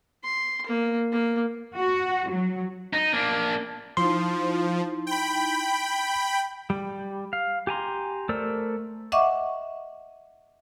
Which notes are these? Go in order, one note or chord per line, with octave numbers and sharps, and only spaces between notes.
C6
A#3
A#3
F#4
F#3
D#4
A#3 D4
F3 D#4 E4 C6
G5 B5
G3
F5
G4 G#5 A#5 C6
A3 A#4 C5 D5 E6
D#5 E5 F#5 C#6 D6